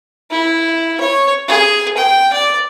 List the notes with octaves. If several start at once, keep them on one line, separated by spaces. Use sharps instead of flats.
E4
C#5
G#4
G5
D5